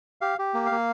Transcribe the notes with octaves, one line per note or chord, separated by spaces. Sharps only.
G4 F5
G4
A#3
F5
A#3